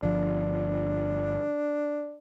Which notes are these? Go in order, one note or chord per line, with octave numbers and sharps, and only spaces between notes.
G1 F3 D4